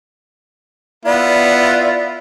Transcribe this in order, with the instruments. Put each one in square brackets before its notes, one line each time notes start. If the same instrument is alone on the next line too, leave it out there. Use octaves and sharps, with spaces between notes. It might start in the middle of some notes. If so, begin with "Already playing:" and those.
[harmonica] B3 E4 F4 [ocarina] D5